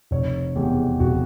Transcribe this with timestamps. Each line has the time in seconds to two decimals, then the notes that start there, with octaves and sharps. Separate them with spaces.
0.11 F1 C#5
0.55 E2 B2 G#3 G4
1.00 F1 F#4